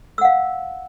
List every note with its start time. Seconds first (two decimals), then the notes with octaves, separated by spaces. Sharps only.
0.18 E6
0.21 F#5
0.25 F5